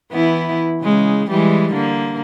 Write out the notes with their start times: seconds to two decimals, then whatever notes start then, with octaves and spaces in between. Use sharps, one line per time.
0.12 E3 B3 E4
0.82 C#3 G#3
1.30 E3 G3 G#3
1.73 D3 A#3